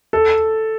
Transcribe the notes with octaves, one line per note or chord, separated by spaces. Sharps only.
A4